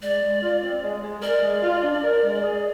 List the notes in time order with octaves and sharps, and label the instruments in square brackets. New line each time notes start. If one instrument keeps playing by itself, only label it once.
[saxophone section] G#3 [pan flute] D5
[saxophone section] G#3
F4
C4
G#3
G#3
[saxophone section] A#4 [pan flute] D5
[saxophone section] G#3
F4
D4
A#4
G#3
G#4